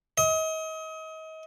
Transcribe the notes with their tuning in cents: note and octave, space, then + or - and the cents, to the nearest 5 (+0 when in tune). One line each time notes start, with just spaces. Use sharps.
D#5 +35